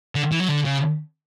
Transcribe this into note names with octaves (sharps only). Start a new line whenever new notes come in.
D3
E3
F#3
D3
C#3